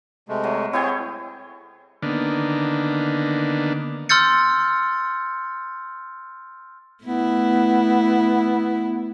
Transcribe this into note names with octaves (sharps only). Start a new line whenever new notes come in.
C3 G#3 A3
F#3
C4 E4 G#4 C#5 G5 G#5
D3 D#3 A#3 B3 D4
C6 E6 F6 G6 A6 C#7
A3 B3 E4